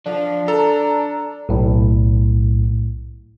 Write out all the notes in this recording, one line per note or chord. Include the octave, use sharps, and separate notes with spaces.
F3 D4
A4 A#5
B1 A2